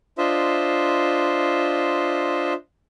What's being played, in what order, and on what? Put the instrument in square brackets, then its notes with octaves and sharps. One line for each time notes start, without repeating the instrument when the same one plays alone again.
[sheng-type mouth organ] D4 F4 C5 D#5 E5